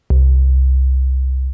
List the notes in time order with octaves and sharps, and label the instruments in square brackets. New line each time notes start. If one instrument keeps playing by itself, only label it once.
[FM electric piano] C2